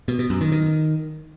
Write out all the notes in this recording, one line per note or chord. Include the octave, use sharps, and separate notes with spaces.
B2
B2
F#2
D#3
D#3